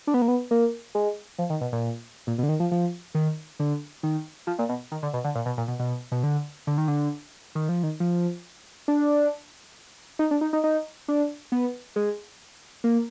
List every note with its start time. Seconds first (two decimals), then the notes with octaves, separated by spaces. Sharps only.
0.07 D4
0.14 B3
0.22 A#3
0.28 B3
0.51 A#3
0.95 G#3
1.38 F3
1.50 D#3
1.61 B2
1.72 A#2
2.27 A#2
2.38 B2
2.43 D3
2.49 D#3
2.60 F3
2.72 F3
3.15 D#3
3.60 D3
4.03 D#3
4.47 F3
4.59 A#2
4.69 B2
4.92 D#3
5.03 D3
5.13 B2
5.24 D3
5.35 A#2
5.46 B2
5.57 A#2
5.68 B2
5.79 B2
6.12 B2
6.23 D3
6.67 D3
6.78 D#3
6.88 D3
7.55 D#3
7.69 F3
7.83 D#3
8.00 F3
8.88 D4
10.19 D#4
10.31 D4
10.41 D#4
10.53 D#4
10.64 D#4
11.08 D4
11.52 B3
11.96 G#3
12.84 A#3